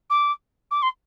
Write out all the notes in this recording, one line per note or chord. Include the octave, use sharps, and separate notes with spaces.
D6
D6
C6